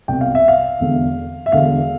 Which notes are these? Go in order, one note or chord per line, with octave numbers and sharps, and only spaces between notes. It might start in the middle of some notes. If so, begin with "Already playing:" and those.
C2 B2 G5
F5
E5
F5
E1 E2 D3
E5
E1 E2 D3 F5